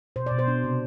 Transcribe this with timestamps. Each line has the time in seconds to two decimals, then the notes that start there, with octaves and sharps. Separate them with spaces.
0.16 B2 C5
0.26 B2 D5
0.39 C5
0.48 D4
0.64 C3